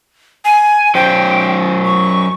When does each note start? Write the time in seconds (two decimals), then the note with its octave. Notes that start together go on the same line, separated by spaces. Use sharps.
0.45 G#5
0.95 F#3 C#4 C5 G5
1.85 C#6